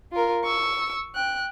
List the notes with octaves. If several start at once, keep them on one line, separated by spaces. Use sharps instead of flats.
F4 A#4
C#6 E6
G5 F#6